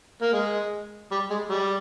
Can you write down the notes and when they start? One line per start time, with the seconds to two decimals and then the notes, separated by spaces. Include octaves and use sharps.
0.22 A#3
0.34 G#3
1.12 G3
1.30 G#3
1.50 G3